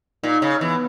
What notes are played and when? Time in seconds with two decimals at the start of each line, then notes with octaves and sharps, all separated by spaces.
0.23 A#2 D#4
0.42 C#3
0.61 E3 B3